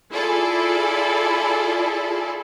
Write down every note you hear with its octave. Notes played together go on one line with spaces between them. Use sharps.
E4 F4 G#4 A4 D5